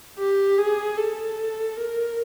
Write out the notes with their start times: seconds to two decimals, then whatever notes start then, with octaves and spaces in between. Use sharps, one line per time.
0.19 G4
0.58 G#4
0.98 A4
1.77 A#4